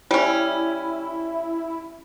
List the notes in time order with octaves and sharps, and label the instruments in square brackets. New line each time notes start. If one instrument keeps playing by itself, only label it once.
[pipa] G3 C#4 [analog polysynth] E4